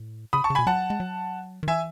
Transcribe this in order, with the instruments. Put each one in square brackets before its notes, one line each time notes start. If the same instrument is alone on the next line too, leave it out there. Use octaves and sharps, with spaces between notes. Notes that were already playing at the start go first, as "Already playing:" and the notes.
Already playing: [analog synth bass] A2
[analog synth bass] C#3 [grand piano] B5 D#6
[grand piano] A5 C#6
[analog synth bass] C#3
[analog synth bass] B2 [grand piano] G#5 B5
[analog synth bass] F#3 [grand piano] F#5 A5
[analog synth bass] G#3
F#3
D#3
[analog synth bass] E3 [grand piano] E5 G#5